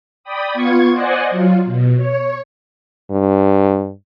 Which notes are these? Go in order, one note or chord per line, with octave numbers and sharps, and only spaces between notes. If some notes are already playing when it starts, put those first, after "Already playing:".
D5 G5 B5 D#6
B3 F4 C#6 G#6
C5 D5 D#5 F#5 G#5
F#3 F4
B2
C#5
G2